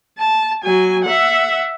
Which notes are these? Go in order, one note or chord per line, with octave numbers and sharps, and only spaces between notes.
A5
F#3 G#5
E5 F#5